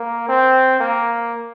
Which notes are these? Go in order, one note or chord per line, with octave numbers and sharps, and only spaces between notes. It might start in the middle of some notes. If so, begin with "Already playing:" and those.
Already playing: A#3
C4
A#3